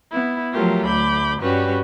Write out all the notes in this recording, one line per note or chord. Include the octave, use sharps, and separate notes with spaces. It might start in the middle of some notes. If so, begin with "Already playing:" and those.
B3 E4
F3 F#3 A3 F4 G4 A#4
D2 B5 D6 G6
G2 G3 C#4 F#4 G4 B4